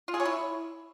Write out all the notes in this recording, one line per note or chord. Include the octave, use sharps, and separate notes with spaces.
F4
G#4
C#5
E4